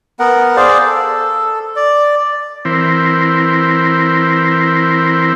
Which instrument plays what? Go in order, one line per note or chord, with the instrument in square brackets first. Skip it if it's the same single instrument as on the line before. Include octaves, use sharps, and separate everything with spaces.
[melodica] B3 A#4 F#5
G#4 C5 D5 F5
A4
D5
[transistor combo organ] E3 C4 E4 A#4 C5